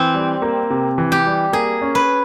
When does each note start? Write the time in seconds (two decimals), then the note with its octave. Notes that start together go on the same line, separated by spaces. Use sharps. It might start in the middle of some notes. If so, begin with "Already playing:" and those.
Already playing: E3 C4
0.15 G3
0.42 A#3
0.70 C3
0.98 E3
1.12 G4
1.26 G3
1.53 A#3 G#4
1.82 C#4
1.95 B4